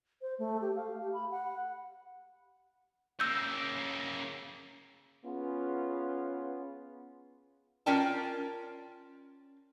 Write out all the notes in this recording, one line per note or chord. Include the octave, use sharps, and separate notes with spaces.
C5
A3
G4
F5
G4
B5
F#5
C#3 A#3 E6 G6
B3 C#4 F4 G#4
C#4 F4 A#4 D5 G5 A5